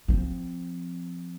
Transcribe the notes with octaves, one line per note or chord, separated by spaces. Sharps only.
F3 C4